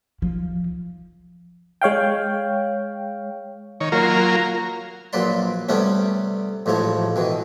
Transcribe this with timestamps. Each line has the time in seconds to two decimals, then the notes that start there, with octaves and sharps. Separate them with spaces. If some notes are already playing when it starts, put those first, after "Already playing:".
0.22 F3
1.82 G#3 C#5 F5 G5
3.80 D#3 C#5
3.92 F#3 A#3 F4 A#4
5.13 A#1 A#2 F#3 B4 D5 C6
5.69 C3 G3 A3 B3 C#4
6.66 A1 G#2 F3 A3 C#5
7.16 B2 D#3 E3